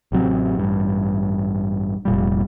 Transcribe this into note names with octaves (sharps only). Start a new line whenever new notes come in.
A1 C3 F#3 C4
A1 G2
F1 A#2 G3